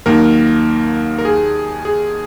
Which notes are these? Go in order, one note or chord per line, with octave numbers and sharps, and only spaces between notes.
D#2 D#3 F#3 A#3 A#4
A#4
G#4
G#4